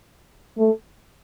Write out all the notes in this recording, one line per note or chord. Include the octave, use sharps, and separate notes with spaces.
A3